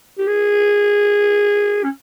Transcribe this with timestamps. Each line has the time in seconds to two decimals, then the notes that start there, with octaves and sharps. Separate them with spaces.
0.19 G4
0.27 G#4
1.84 C#4